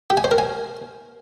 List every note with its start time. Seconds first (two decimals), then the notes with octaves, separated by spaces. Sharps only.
0.10 G4
0.17 G#5
0.24 C5
0.31 A#4
0.38 G#5